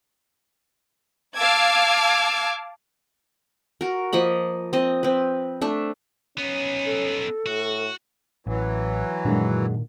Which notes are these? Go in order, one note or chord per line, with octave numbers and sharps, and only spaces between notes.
F5 A5 D6 E6 G#6
F#4 A#4
F3 A#3 D#5 B5
C4 D#5
C4 B4
A3 D4 E5
B3 C#4 D#4
A4
A2 F#4
A1 E3 F#3
F#2 A#2 D#3 G#3 D4